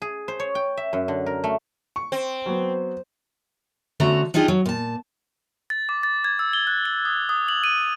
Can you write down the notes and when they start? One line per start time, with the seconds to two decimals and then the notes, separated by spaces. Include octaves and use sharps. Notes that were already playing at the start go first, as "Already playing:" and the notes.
0.02 G#4
0.28 C5
0.40 C#5
0.55 G5
0.77 E5
0.93 F#2
1.08 D3
1.26 A#4
1.44 A3
1.96 C#6
2.12 C4
2.46 F#3 B3
4.00 D3 A3 C#4 F#4 A#5
4.34 D4 D#4 F4 G4 G#4
4.48 F#3
4.66 A#2 A5
5.70 A6
5.89 D6
6.03 A6
6.24 G#6
6.39 E6
6.53 G7
6.67 F#6
6.85 G7
7.05 D#6
7.29 D#6
7.49 F#7
7.64 D#7